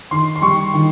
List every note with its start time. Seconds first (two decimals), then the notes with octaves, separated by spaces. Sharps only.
0.11 D#3 C6
0.36 C6
0.42 G3 C#6
0.74 D#3